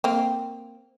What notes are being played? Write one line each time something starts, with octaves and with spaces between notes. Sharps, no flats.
A#3 C4